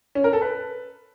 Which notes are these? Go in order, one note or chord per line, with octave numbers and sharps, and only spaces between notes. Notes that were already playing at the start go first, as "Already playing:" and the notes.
C#4
A#4
A4
B4